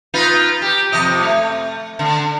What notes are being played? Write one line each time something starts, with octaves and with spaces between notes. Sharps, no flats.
D#4 F4 B4
G4
F2 C3 D#5
A3
D3